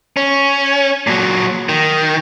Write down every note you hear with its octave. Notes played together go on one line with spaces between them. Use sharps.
C#4
A#2 F#3
D#3